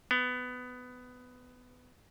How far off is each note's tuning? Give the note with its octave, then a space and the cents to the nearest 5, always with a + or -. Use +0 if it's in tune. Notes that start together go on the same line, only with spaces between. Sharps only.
B3 +15